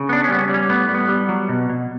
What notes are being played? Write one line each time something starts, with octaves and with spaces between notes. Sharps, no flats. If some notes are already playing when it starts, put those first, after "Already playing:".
Already playing: C#3
B3 D4
C#4
G3 B3
C#4
G3
C#4
A2 B3
G3
B3
G3
F#3
B2
B2